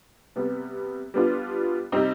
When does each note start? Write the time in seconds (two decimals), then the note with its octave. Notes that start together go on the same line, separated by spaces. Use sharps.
0.36 C3 G3 B3
1.14 G3 B3 D4 F4
1.92 C3 G3 C4 D#4